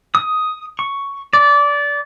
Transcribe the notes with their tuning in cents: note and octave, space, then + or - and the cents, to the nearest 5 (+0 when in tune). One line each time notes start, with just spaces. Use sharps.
D#6 +10
C#6 +5
D5 -20